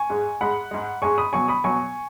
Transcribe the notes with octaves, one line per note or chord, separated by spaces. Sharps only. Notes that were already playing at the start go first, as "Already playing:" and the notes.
Already playing: G#5 C#6
G#2 G#3
G#2 G#3 F#5 B5
G#2 G#3
G#2 G#3 G#5 C#6
B5 D#6
B2 F#3 G#5 C#6
B5 D#6
B2 F#3 G#5 C#6